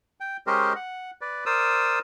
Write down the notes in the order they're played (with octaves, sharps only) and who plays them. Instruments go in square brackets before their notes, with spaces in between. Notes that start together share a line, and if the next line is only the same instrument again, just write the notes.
[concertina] G5
G#3 C#4 G4 A#4 C5 D#5
F#5
B4 D5
A#4 C5 D5 D#6 E6